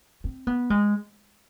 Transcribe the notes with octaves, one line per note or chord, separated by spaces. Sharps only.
C4
B3
G#3